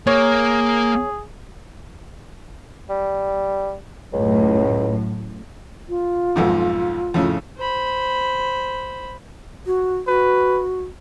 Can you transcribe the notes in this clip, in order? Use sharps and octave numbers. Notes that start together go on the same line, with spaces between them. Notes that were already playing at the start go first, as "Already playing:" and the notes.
A#3 G#4 C#5
G3
C#2 F#2 A2
F4
B1 F2 G#2
F2 A2 C#3
C5 B5
F#4
F#4 B4